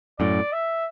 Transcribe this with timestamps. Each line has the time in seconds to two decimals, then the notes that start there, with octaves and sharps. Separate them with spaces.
0.19 F#2 A2 D5
0.52 E5